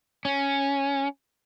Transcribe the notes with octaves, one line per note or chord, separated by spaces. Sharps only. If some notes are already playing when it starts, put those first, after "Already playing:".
C#4